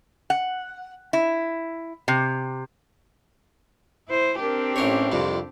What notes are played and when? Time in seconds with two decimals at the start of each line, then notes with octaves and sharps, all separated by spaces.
0.30 F#5
1.13 E4
2.08 C3
4.08 E4 C5
4.40 C4 D4 G4 A#4
4.76 A1 C#4 A#4 C#5
5.12 C2 F2 C3 F4